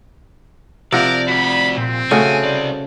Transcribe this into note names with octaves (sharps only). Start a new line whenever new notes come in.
C3 F3 A#4 D5 F#5
F#4 D5 B5
A#2 C4
C#3 A3 F#4 G#5
C2 D5